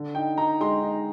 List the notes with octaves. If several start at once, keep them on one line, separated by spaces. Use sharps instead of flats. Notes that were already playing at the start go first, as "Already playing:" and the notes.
Already playing: D3
D#4 G5
D#4 A#5
G#3 C6
D#4